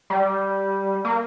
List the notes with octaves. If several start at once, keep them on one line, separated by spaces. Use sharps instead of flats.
G3
A#3